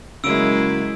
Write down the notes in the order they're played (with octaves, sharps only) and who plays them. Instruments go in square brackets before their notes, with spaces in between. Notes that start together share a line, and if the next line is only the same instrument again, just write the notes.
[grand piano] C#3 F#3 A#3 [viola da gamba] G#3 E4 [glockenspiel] E6 D7